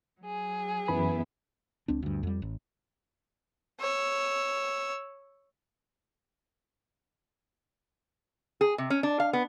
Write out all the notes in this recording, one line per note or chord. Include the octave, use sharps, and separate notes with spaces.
F#3 G#4
F#2 E3 B3 E4 B5
C#2 C4 D4
D2 G2
F2 G3
A1
C#5 E6
G#4
C3
C#4
D4
F5
B3